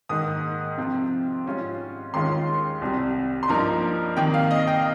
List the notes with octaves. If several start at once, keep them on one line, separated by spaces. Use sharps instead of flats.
G#2 D#3 A#3 D#4 D#6
C3 F3 C4 F4
G#2 G3 C#4 F4
D#2 D#3 G#3 C#4 F4 C6
C2 C3 G3
C6
G2 F3 A#3 D#4 A#5
C3 D#3 A#3 G5
F5
D#5
G5